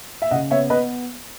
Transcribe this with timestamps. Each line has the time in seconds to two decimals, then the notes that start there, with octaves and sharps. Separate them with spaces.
0.22 E5
0.31 C#3 D#5 F#5
0.50 B3 C#5 E5
0.70 B3 B4 D#5